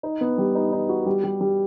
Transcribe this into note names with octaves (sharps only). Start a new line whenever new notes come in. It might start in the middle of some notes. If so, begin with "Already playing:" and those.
D#4
B3
G3
D#4
D#4
F#4
G3
G3
G3